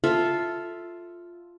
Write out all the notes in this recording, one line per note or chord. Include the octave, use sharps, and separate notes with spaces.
F4 A4 E5 F5